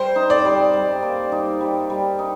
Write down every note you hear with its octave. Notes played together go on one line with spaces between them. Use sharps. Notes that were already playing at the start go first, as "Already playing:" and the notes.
Already playing: G3 C5
D#4
D5
G3
G3
A#3
D#4
G3
G3
D#4